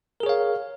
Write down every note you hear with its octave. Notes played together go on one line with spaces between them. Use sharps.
G#4 A#4 C#5 F5